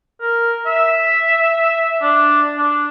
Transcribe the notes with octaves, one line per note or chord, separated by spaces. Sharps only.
A#4
E5
D4
D4